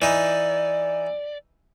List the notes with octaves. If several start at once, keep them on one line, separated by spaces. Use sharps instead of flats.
E3 D#4 D5